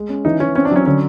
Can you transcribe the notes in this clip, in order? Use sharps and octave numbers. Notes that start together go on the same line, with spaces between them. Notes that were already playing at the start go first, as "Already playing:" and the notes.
Already playing: G#3
C#4
E3 D#4
E3 C#4
C4 C#4
D4
F#3 C#4
D3 C#4